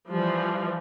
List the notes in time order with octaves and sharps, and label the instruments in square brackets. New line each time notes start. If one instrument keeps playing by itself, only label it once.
[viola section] E3 F3 G3